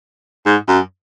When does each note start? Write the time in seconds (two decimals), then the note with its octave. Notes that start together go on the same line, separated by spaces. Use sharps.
0.46 G#2
0.68 F#2